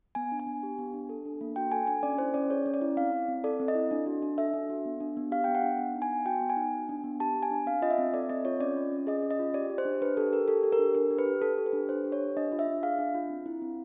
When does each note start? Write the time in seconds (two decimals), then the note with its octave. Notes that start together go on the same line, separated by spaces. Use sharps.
0.15 B3 G#5
0.32 D4
0.40 G#5
0.47 B3
0.63 G4
0.79 B3
0.94 D4
1.09 A4
1.25 D4
1.41 A#3
1.56 F#4 G5
1.72 A4 G#5
1.87 D4 G#5
2.03 C#4 D5
2.18 E4 C5
2.34 C#4 D5
2.50 G#4 C#5
2.66 C#4
2.74 D5
2.81 E4
2.97 C4 F5
3.13 E4
3.29 C4
3.44 A4 D5
3.60 C4
3.68 D#5
3.75 E4
3.91 D4
4.06 F#4
4.22 D4
4.38 A4 E5
4.54 D4
4.69 F#4
4.85 B3
5.00 D4
5.17 B3
5.32 G4 F5
5.44 B3 G5
5.55 F#5
5.63 D4
5.79 B3
5.95 D#4
6.02 G#5
6.11 B3
6.26 F#4 G5
6.41 B3
6.50 G#5
6.57 D#4
6.73 B3
6.89 D4
7.04 B3
7.20 G4 A5
7.36 B3
7.43 G#5
7.51 D4
7.66 C4 F5
7.82 F4 D#5
7.91 E5
7.98 C4
8.14 A4 D5
8.29 C4 D#5
8.45 F4 C#5
8.60 C#4 D5
8.76 F4
8.92 C#4
9.07 G#4 D#5
9.23 C#4
9.31 D#5
9.39 F4
9.54 G4 D5
9.70 G4
9.78 C5
9.85 D4
10.01 D4 B4
10.17 G4 A4
10.33 G4 A#4
10.48 G4 A4
10.63 G4
10.72 A#4
10.79 D4
10.95 D4 A#4
11.11 G4
11.19 B4
11.26 G4
11.42 G4 A4
11.58 G4
11.66 B4
11.73 D4
11.89 D4 C5
12.05 G4
12.12 C#5
12.20 G4
12.37 D4 D#5
12.52 F4
12.59 E5
12.67 D4
12.83 G#4 F5
12.98 D4
13.15 F4
13.30 C4
13.46 E4
13.62 C4